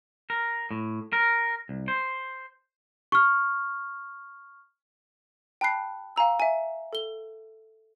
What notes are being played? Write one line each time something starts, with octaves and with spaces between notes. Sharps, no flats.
A#4
A2
A#4
C2
C5
C#6 F6
G5 A5 B5 F#6 C7
F5 G#5 A#5 E6
E5 G#5
A4 G7